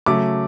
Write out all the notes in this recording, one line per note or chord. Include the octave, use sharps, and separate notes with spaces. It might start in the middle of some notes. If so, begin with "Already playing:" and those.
C#3 F#3 A3 D6